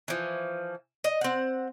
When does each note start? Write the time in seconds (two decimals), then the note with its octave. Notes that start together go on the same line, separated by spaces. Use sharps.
0.08 E3 F3
1.04 D#5
1.21 C4 F#5